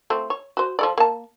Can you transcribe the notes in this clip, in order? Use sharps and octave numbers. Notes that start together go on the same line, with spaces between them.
A3 C4 F4
C#5
F#4 C5
F3 A4 D5
A#3 A5